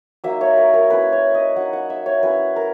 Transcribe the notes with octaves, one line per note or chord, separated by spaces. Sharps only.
F#3 A#3 D#4 E5
C#5
A#4
A#4
A#3 C#4 E4 B4
C#5
D#5
F#3 A#3 D#4 F#5
F#5
E5
C#5
F#3 C#4 E4 B4
A#4